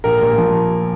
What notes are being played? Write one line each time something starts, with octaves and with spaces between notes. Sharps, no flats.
A#1 A#4
A#2
F3